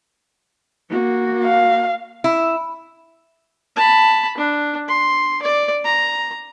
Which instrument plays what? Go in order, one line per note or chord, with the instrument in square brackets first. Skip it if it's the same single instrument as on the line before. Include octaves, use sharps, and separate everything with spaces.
[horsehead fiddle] A#3 F#4
[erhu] F5
[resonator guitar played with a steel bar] E4
[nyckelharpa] A5 B5
D4
C6
D5
A#5